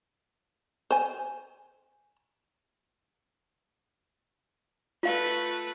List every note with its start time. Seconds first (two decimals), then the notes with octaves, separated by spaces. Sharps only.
0.91 C5 G#5
5.03 A3 F4 B4 F5